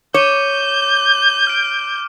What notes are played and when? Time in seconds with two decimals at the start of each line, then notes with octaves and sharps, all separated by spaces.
0.14 C#5 D6 G6 D#7
1.47 F6 D7